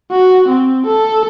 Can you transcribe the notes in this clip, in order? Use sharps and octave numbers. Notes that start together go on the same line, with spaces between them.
F#4
C4
A4